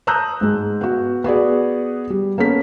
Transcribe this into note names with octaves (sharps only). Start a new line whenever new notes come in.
A5 A#5 D#6 E6 F#6 G6
G#2 G#3
B3 F#4
B3 F#4 G#4 D5
G3
A#3 B3 C#4 A4 B6